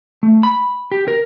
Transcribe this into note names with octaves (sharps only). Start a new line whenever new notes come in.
A3
B5
G4
A#4